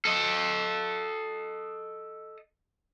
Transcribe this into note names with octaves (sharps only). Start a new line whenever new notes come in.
A4 D#5